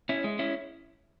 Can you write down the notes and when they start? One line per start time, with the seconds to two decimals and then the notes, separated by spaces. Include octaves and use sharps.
0.09 C#4 E4
0.24 G#3
0.39 C#4 E4